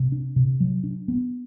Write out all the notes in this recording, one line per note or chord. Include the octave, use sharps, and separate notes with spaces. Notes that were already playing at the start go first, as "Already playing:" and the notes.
Already playing: C3
D4
C3
F#3
D4
B3